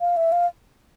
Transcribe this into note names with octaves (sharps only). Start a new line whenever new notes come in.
F5
E5
F5